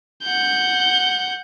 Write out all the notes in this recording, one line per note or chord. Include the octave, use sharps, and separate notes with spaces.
F#5 G6